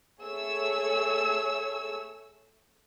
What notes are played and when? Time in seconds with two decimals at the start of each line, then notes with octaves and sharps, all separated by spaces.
0.21 A3 G#4 C#5 E6